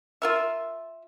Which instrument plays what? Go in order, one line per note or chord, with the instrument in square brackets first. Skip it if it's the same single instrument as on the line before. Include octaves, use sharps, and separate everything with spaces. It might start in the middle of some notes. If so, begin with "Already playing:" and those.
[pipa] F4 A#4 E5